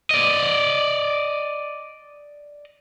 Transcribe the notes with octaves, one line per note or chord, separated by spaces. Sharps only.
D5 D#5